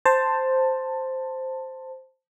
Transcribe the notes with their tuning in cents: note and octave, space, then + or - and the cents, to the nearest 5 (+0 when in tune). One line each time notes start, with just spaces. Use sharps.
C5 +0 A5 +15